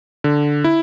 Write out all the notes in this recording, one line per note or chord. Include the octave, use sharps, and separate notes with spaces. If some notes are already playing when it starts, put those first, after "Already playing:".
D3
E4